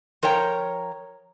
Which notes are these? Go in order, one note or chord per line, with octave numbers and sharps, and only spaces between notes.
F3 A#4 C#5 G5 G#5 A#5